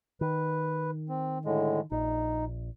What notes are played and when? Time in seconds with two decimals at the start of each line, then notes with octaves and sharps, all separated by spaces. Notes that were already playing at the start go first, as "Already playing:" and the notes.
0.21 D#3 B4
1.09 C4
1.45 A2 D3 G#3
1.91 A#1 D#4